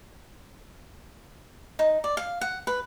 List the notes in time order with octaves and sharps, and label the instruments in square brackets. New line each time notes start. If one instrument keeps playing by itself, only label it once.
[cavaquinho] D#4
D5
F5
F#5
B4